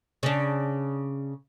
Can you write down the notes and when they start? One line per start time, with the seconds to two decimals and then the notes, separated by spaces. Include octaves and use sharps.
0.23 C#3 D4